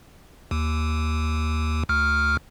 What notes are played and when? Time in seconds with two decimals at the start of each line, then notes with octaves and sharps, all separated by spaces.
0.51 D#2
1.89 D2 F6